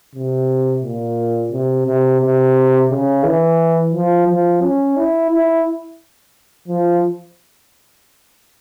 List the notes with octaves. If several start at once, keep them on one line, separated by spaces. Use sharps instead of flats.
C3
A#2
C3
C3
C3
C#3
E3
F3
F3
C#4
E4
E4
F3